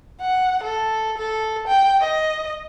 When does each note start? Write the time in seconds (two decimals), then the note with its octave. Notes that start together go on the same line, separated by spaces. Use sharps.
0.21 F#5
0.63 A4
1.18 A4
1.68 G5
2.01 D#5